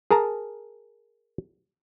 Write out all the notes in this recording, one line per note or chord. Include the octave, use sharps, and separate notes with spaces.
G#4 A#4 A5 A#5